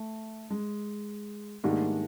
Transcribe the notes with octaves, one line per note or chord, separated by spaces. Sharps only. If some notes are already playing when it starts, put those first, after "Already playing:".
Already playing: A3
G#3
G#2 D#3 G3 A3 A#3 D4